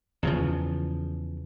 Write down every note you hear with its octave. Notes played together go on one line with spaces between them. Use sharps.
E2 C#3 F3